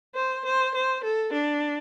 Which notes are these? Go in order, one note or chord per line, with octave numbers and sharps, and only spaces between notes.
C5
C5
C5
A4
D4